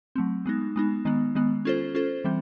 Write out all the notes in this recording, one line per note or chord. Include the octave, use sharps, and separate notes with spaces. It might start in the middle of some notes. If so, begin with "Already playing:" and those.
F#3 A3 C4
G#3 B3 D#4
G#3 B3 D#4
D#3 G#3 B3
D#3 G#3 B3
C#4 F4 A4 C5
C#4 F4 A4 C5
E3 G3 C4